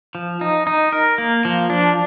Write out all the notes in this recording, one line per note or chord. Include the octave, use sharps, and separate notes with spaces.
F3
D#4
D#4
A#4
A#3
F3
D4